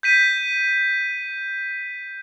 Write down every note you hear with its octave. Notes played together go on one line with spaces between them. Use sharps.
G6 B6 D#7